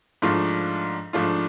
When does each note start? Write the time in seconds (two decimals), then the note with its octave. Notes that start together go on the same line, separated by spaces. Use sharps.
0.22 G#2 F3 A3 D4 F4
1.13 G#2 F3 A3 D4 F4